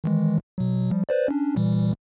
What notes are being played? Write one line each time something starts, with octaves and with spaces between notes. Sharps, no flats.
D#3 E3 G#3
B2 F#3
F3 G3
B4 C5 D5
C#4 D4
A#2 E3 G3